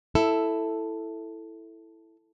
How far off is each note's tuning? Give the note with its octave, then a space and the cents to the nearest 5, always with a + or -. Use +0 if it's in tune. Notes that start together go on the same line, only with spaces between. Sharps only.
E4 +0 A4 +5